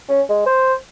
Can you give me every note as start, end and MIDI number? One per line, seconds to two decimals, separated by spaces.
0.09 0.21 61
0.29 0.45 56
0.46 0.74 72